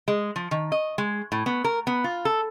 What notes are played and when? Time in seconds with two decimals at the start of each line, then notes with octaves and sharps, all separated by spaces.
0.08 G#3
0.36 F3
0.51 D#3
0.72 D#5
0.98 G#3
1.32 A2
1.46 B3
1.64 A#4
1.87 B3
2.04 F4
2.25 A4